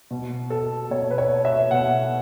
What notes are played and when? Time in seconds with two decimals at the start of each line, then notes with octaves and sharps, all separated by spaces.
0.11 B2
0.50 A4
0.91 B2 C#5
1.11 B4
1.18 C#5
1.45 E5
1.71 B2 F#5